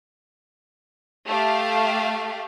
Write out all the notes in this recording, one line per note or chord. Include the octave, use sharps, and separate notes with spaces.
A3 G4 F5